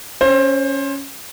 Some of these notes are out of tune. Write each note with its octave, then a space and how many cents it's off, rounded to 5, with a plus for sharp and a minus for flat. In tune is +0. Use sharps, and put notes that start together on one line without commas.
C#4 +0 C5 +25